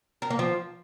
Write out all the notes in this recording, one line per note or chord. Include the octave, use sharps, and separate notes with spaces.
A#4
A#3
F3